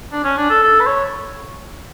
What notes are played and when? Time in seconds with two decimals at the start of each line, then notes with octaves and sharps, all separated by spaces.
0.12 D4
0.24 C#4
0.38 D4
0.50 A4
0.62 A4
0.80 B4
0.86 C#5